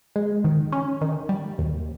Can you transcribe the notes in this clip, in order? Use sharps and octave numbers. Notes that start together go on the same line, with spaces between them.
G#3
D#3
C#4
D#3
G3
D#2